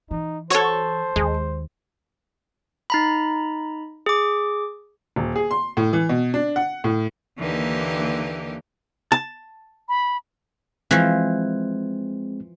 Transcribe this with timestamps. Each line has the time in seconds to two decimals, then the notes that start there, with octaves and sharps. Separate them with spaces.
0.11 E3 D#4
0.50 F#4 A4 C5 C#5 C#6
1.16 D#2 G#3
2.90 D#4 A#5 B5
4.06 G#4 D6
5.16 D#1
5.36 G#4
5.51 C6
5.77 A2
5.93 E3
6.09 B2
6.34 D4
6.56 F#5
6.84 A2
7.39 D#2 D3 E3 A#3 D#4 G4
9.12 A5
9.88 B5
10.91 E3 F3 G#3 C4